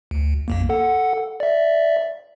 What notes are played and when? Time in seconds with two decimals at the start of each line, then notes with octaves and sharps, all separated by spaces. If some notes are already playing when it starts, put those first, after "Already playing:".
0.11 D2
0.48 B1 F2 A#3
0.69 A4 F#5
1.40 D5 E5